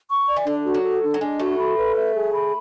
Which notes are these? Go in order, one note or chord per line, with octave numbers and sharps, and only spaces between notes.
C#6
D5
E3
D3 D4
F#4
F#3
A4
D4
F#3
G#3 D4
A2 A3 F#4
B5
B4
E5
G#4
B5